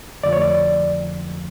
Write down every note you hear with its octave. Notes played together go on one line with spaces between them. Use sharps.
F2 D3 F3 A3 D5
C#5
D5